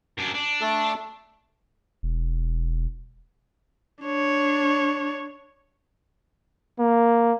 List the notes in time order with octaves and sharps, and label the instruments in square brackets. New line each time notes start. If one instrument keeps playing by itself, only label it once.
[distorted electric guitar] F#2 D4
D4
[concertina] A3 A4 A5
[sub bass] E1
[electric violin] D4 C#5
[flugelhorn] A#3